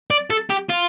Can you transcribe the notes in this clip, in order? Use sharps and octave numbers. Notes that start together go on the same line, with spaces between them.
D5
A4
G4
F4